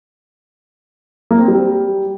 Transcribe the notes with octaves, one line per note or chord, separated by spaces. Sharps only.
A#3
C4
G3